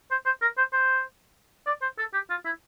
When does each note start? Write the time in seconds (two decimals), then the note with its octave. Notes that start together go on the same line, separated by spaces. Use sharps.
0.11 C5
0.26 C5
0.42 A#4
0.58 C5
0.73 C5
1.67 D5
1.82 C5
1.98 A4
2.13 G4
2.30 F4
2.45 E4